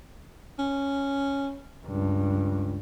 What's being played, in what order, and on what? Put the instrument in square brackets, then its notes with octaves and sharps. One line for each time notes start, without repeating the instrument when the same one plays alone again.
[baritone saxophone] C#4
[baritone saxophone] C#2 [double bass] G2